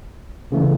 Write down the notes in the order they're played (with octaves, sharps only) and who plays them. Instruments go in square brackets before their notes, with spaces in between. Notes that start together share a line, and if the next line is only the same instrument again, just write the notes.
[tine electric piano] D2 C#3 E3 A3